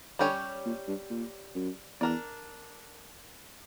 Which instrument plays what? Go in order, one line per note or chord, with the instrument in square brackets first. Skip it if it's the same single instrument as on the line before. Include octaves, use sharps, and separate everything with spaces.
[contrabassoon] D3 [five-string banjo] G3 C#4 G4 C#5
[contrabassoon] A#2
G2
A#2
F#2
[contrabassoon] E2 [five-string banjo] D4 A#4 D5